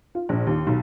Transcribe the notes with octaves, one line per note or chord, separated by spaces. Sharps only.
F4
A#1
D#2
B1